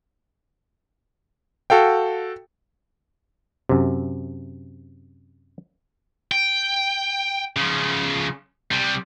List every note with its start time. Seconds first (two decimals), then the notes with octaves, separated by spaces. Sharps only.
1.70 F#4 A4 F5 G5
3.69 F#2 C3
6.31 G5
7.57 C#3 F3
8.72 C3 G3